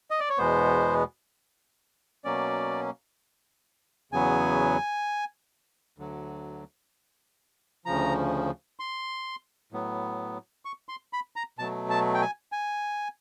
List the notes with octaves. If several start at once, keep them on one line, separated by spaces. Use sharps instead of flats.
D#5
D5
C#5
E2 B2 G#3 B3 C5
B2 F#3 A#3 C#4 D5
E2 C#3 F#3 B3 G#5
D2 D3 F#3
D2 C#3 F3 A#5
C6
A2 F#3 B3
C#6
C6
B5
A#5
B2 F#3 A3 A5
A5
G5
G#5
G#5